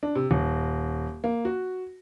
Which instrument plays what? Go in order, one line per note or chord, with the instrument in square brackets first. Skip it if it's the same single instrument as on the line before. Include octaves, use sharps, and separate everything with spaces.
[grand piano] D4
C3
D#1
A#3
F#4